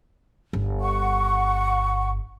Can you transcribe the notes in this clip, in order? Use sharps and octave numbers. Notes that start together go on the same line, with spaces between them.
G1
F#5 C#6